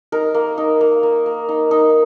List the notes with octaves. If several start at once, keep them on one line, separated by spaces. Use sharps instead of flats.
D#4 A#4
A#3
D#4
A#3
A#3
A#3
D#4
D#4